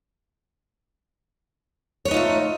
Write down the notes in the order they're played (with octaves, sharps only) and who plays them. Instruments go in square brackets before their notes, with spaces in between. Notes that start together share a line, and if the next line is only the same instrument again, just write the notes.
[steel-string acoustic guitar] C#5
B4
D#4
F4
A3